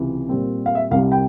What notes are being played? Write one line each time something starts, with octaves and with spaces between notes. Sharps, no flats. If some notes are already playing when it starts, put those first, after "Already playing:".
Already playing: C#2 C3 E3
A#2 G3 C4
F5
E5
C2 C3 G3 F5
G5